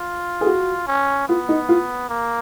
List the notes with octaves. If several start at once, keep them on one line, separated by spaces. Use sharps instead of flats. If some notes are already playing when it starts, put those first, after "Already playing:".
Already playing: F4
G#4
F#4
C#4
B3 F4
D#4
F4
A#3